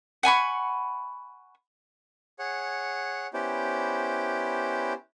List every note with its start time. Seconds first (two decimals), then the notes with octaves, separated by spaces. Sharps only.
0.23 F#5 G#5 B5 C#6
2.39 G#4 C#5 F#5
3.33 B3 C#4 E4 G4 C5 D5